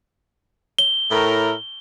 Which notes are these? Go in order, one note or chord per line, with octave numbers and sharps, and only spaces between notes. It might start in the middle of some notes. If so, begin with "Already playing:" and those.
G7
A2 E4 A#4